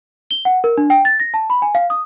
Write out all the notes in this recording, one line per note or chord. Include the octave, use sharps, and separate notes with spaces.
G7
F#5
A#4
D4
G5
A6
A#6
A5
B5
G#5
F5
D#6